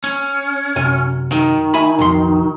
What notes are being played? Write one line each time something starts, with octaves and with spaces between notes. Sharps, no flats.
C#4
F#2 C3 G#5
D#3
E5 G#5 B5
B1 F2 C6